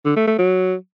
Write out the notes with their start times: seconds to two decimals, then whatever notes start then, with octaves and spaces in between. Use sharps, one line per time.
0.05 D3
0.16 A3
0.27 A3
0.38 F#3